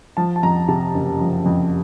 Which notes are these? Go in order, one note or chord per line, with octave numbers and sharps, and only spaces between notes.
F3 A5
A5
F2 A#5
C3 A5
F#1
F3
F2